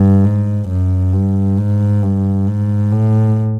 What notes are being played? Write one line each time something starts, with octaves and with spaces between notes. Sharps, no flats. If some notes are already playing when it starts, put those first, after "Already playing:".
Already playing: G2
G#2
F#2
G2
G#2
G2
G#2
A2